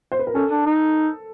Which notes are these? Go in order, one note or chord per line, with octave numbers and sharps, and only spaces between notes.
C5
B4
A#4
C#4 A4
D4
D#4